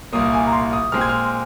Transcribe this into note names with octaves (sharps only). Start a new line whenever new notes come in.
C2 A#2 A#3 D#6
G#5
A#5
C6
D#6
A#2 G#3 C4 F6
G#6
F6